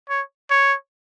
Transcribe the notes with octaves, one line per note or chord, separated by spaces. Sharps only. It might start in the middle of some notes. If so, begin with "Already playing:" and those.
C#5
C#5